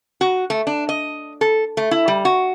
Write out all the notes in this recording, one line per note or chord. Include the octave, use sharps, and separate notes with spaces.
F#4
A3
D4
D#5
A4
A3
E4
G3
F#4